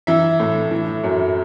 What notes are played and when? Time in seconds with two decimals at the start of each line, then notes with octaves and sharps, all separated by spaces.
0.07 E3 E5
0.40 A2
0.71 E3
1.04 F#2